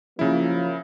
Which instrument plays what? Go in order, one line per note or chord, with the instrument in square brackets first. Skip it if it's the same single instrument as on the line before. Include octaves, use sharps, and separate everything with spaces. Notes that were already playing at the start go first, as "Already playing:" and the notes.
[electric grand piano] C#3 E4 [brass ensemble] F3 F#3 A#3